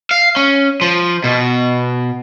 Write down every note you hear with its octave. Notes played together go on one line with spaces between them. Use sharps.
F5
C#4
F3
B2